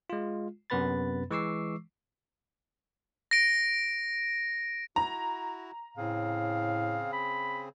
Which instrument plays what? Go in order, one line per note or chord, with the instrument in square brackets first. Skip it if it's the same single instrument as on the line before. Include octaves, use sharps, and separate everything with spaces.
[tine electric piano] G#3 F4
F#2 C3 B3 B4 B5 A6
E3 G#3 C#6 D6 E6 C7
[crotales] A#6 D7
[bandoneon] E4 F#4 [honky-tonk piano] A#5
[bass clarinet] A2 [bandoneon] C#3 C4 G#4 [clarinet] F5
[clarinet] B5